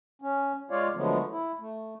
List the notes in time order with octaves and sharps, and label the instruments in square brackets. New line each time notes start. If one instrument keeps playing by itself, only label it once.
[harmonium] C#4
G#3 F4 C#5 D5 F5
D3 F3 F#3 G#3 A3 B3
E4
A3